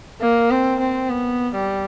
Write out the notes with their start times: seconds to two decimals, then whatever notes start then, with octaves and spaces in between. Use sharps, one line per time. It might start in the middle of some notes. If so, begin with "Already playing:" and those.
0.21 A#3
0.50 C4
0.80 C4
1.10 B3
1.55 G3